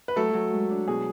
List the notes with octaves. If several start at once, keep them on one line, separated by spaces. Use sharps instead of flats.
B4
F#3 A3 A4
F#3
G#3
D4
B2 G#4